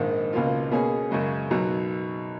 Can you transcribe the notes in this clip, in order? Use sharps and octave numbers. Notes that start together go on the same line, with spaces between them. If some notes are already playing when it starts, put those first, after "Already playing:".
Already playing: A#1 G#2 D#3
C#2 B2 A#3 F4
B2 A#3 C#4 G#4
F#2 C#3 G#3
B1 B2 F#3